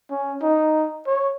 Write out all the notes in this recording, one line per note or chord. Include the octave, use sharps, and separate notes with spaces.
C#4
D#4
C#5